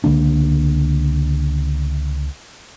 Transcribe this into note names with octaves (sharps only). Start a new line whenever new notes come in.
C#2 D3 A#3 D4